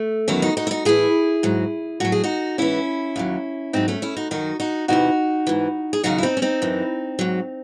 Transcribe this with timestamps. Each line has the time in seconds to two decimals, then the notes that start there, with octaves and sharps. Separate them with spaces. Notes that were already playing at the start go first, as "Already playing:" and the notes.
Already playing: A3
0.28 E2 D#3 F#3 C#4 E4
0.42 D#4 F#4
0.57 D#4 F#4
0.67 E4
0.71 D#4 F#4
0.85 A2 E3 E4 G#4
1.43 G#2 F#3
2.00 A2 F#3 F#4
2.12 G#4
2.24 D#4 F#4
2.58 G#2 E3 C#4 E4
3.16 D#2 D#3 F#3
3.73 G#2 F#3 C4 D#4
3.88 A3 C#4
4.02 C#4 E4
4.17 D#4 F#4
4.31 F#2 D#3 F#3 D#4 F#4
4.60 D#4 F#4
4.88 E2 C3 E3 D#4 F#4
5.47 G#2 E3
5.93 G#4
6.03 D#2 C#3 F#3 D#4 F#4
6.18 E4
6.23 C4 D#4
6.37 C#4
6.42 C4 D#4
6.62 F#2 E3
7.19 G#2 F#3